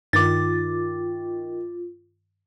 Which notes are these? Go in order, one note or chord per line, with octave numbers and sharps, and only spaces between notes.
G2 D#3 F4 D6 A6